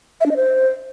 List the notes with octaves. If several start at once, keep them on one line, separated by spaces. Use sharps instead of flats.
E5
D4
D#5
C5